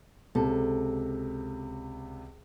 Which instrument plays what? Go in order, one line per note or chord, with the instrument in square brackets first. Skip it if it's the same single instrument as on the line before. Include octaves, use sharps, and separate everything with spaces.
[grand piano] C#2 C3 [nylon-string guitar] A4